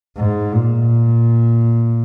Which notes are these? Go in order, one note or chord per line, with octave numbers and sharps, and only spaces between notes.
G#2
A#2